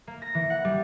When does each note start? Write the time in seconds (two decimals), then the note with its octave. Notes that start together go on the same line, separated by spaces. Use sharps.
0.07 A#3
0.22 A#6
0.35 E3
0.50 F#5
0.65 G3